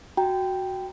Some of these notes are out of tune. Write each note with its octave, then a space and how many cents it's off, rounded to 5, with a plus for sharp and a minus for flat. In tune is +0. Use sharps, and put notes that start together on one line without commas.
F#4 +0 G5 +0 A#5 +0